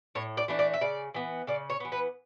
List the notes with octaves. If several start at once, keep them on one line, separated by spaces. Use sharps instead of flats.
A2 C#5
D5
E3 A3 D4
D5
E5
C#3 D5
E3 B3
C#3 D5
C#5
E3 B3
B4